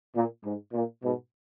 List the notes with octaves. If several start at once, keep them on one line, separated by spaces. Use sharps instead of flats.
A#2
G#2
A#2
G#2 B2